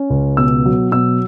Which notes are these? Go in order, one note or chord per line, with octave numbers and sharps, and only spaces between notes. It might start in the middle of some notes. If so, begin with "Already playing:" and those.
Already playing: C#4
C#2
B2 E6
F#3
B2 E6